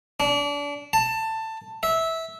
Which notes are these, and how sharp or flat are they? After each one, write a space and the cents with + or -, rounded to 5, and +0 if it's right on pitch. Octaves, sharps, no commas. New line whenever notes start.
D4 -30
A5 +15
E5 -15